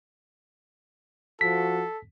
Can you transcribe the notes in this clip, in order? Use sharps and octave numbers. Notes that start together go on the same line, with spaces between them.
F3 F#4 A4 B6